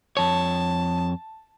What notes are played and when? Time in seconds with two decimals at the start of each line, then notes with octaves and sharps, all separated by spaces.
0.17 F2 C#5 A5